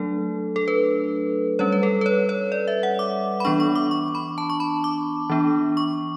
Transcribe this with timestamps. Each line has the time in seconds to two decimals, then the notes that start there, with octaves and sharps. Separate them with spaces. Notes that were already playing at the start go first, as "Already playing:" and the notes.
Already playing: F#3 A3 D4 A4
0.56 A4
0.68 B4
1.59 G3 C#4 C#5
1.72 B4
1.83 A4
2.01 B4
2.06 C#5
2.29 C#5
2.52 D5
2.68 E5
2.83 F#5
2.99 D6
3.40 B5
3.45 E3 B3 D4 C#6
3.60 C#6
3.75 D6
3.91 C#6
4.15 B5
4.38 A5
4.50 C#6
4.60 B5
4.84 D6
5.30 E3 B3 D4
5.77 C#6